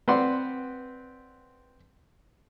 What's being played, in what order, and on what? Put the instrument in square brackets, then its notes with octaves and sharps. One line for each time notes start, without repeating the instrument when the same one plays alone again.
[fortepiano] C4 B4 D5 F#5 C6